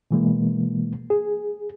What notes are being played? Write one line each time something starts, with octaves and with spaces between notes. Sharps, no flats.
B2 E3 G#3 A#3
G#4